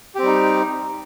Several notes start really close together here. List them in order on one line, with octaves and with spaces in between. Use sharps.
G4 C4 G3 D#4